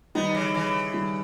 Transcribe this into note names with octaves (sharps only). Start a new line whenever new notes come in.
D#3 G3 B3 D#4
C#3 E3
C#3 E3
D#3 G3